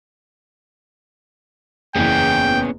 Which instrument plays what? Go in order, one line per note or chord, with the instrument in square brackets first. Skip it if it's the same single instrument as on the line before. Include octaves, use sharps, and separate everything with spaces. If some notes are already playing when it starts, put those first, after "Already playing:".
[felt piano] F#1 E2 [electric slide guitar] B3 C#4 G#4 [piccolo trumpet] G5